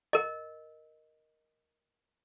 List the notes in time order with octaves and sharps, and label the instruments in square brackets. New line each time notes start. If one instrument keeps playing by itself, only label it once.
[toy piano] A#4 D#5